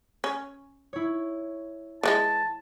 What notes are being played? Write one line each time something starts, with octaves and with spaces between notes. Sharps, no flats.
C#4
E4 C#5
E3 F3 G#3 A5